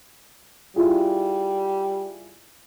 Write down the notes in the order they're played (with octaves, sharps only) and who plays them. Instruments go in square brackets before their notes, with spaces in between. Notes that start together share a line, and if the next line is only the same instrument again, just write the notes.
[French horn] G3 [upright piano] E4 F4 G#4